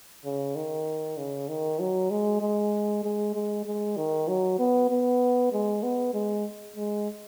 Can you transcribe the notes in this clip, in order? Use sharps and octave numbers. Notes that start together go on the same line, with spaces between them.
C#3
D#3
C#3
D#3
F#3
G#3
G#3
G#3
G#3
G#3
D#3
F#3
B3
B3
G#3
B3
G#3
G#3